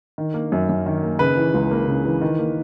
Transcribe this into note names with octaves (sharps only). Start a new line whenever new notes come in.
D#3
A#3
F#2
F#2
D#3
A#3
C#3 B4
E3
C#2
A#3
C#3
E3
D#3
A#3